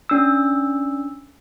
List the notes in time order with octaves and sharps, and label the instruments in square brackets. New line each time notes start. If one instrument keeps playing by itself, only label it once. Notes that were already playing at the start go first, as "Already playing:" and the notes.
[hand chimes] C#4 D4 E6